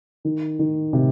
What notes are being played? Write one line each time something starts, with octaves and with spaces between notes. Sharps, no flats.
D#3
D#3
C3